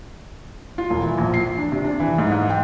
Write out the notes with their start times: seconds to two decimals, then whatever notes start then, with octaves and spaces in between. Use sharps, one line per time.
0.78 F4
0.90 E1
1.04 E3
1.18 A#1
1.34 C7
1.58 D4
1.72 C3
1.84 D4
2.00 E3
2.18 G#2
2.32 G#2
2.50 G5